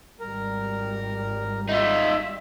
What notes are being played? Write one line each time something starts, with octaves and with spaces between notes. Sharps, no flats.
G#1 G3 A#4
D#4 F4 E5